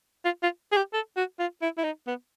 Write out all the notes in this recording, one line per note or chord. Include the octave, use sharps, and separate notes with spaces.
F4
F4
G#4
G4
A4
F#4
F4
E4
E4
D#4
B3